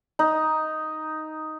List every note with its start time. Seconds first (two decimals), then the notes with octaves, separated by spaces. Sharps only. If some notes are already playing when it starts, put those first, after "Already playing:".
0.19 D#4